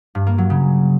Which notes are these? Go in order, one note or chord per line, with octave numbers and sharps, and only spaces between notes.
G2
A#3
F#3
C#3